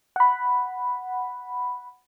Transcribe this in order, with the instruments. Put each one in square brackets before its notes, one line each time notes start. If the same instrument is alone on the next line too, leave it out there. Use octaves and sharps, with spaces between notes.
[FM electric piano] F#5 B5